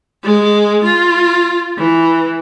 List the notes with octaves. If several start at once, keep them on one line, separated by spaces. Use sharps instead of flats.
G#3
F4
E3